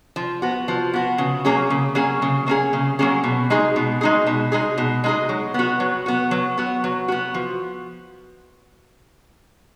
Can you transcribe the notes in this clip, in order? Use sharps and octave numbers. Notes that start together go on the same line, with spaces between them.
F3
B3 F#4
F3
B3 F#4
C#3
F#3 A#3 C#4 G#4
C#3
F#3 A#3 C#4 G#4
C#3
F#3 A#3 C#4 G#4
C#3
F#3 A#3 C#4 G#4
B2
G#3 D#4 G#4
B2
G#3 D#4 G#4
B2
G#3 D#4 G#4
B2
G#3 D#4 G#4
F#3
B3 F#4
F#3
B3 F#4
F#3
B3 F#4
F#3
B3 F#4
F3